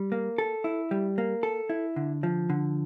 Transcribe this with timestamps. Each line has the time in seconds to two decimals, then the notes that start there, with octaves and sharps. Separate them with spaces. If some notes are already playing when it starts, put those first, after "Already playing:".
Already playing: G3
0.12 A#3
0.38 A4
0.64 E4
0.91 G3
1.18 A#3
1.43 A4
1.70 E4
1.96 D3
2.23 F3
2.50 D3